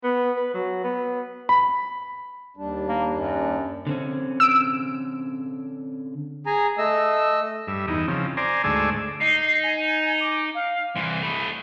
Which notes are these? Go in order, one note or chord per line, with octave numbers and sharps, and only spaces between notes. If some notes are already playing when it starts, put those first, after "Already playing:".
B3
B4
F#3
B3
B5
D#2 G3 D4
A#3
F#2
D3 C4 C#4
E6 D7
G#4 G#5 A#5
A3 D#5 E6
G2 E5
E2 D#4
C#3 F3 C4
C5 D5 G#5 A#5
D2 G#2 A3 D5 G#5 E6
D#4 C7
G#5
D6
F5
C2 E3 C6
A3 D#5 B5